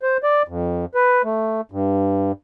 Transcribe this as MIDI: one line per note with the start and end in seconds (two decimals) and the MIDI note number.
0.03 0.17 72
0.23 0.43 74
0.48 0.85 41
0.95 1.22 71
1.24 1.61 57
1.72 2.32 43